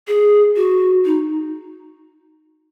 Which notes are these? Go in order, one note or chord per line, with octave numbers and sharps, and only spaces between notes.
G#4
F#4
D#4